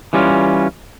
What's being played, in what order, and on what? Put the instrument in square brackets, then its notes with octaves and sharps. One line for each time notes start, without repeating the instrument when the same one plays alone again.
[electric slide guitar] E3 G3 C#4 F4